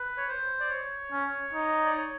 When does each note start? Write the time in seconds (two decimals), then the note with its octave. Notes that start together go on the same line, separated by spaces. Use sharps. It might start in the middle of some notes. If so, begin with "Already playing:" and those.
Already playing: B4
0.17 C#5
0.28 C5
0.60 D5
0.70 C#5
1.12 C#4
1.53 D#4
1.85 D5
1.97 C#5